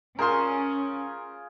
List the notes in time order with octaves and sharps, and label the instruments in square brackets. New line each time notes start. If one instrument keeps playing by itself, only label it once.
[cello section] C#4 [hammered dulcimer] F4 G#4 C5 [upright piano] A#4 C6